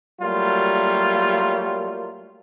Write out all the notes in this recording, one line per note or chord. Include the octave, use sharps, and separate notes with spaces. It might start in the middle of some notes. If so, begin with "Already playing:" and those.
F#3 G3 A3 A#3 F4